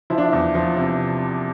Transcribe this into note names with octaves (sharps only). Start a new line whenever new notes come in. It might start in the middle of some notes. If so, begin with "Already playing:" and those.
F3 E4
D4
E4
E2
F3
C3